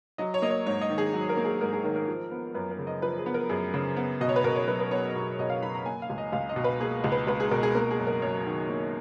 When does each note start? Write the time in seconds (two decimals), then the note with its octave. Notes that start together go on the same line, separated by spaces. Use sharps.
0.18 F#3 D#5
0.34 C#5
0.42 A#3 D#5
0.50 C#5
0.66 G#2 C#5
0.81 D#5
0.90 D#3
0.98 G#4
1.13 F#3
1.29 A#4
1.37 A#3
1.45 G#4
1.61 G#2 A#4
1.73 G#4
1.84 D#3 A#4
1.96 A#4
2.08 F3
2.31 B3
2.54 F#2 B4
2.71 A#4
2.79 C#3
2.87 D#5
3.02 F3 B4
3.18 G#4
3.26 B3
3.34 A#4
3.49 F#2 G#4
3.74 C#3
3.96 B3
4.21 B2 D#5
4.29 C#5
4.36 B4
4.44 B2 A#4
4.56 C#5
4.68 F#3 B4
4.79 B4
4.91 B3 C#5
5.15 B2
5.39 B2 D#5
5.50 F5
5.63 F#3 B5
5.74 A#5
5.85 A#3 G#5
6.02 F5
6.10 C#2
6.18 D#5
6.32 C#2 F5
6.49 D#5
6.56 B2
6.64 B4
6.80 A#3 G#4
7.04 C#2
7.12 B4
7.27 C#2 B4
7.40 G#4
7.51 B2 A#4
7.63 G#4
7.75 A#3 A#4
7.91 G#4
7.99 F#2
8.07 A#4
8.22 F#2 C#5
8.46 D#3
8.69 A#3